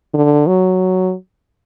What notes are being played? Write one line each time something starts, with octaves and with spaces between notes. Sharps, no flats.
D3
F#3